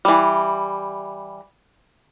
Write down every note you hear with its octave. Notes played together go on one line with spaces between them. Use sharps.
E3 G3